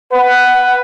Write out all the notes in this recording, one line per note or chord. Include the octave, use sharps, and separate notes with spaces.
B4 F#5